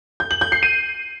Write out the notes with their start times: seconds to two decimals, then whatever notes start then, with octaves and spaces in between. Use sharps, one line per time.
0.20 G6
0.31 F#7
0.41 G6
0.52 C7
0.63 D#7